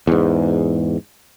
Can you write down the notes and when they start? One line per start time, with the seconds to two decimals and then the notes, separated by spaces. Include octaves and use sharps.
0.07 E2 G#2